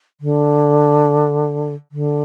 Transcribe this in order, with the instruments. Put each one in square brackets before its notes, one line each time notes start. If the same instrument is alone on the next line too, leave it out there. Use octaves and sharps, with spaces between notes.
[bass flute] D3
D3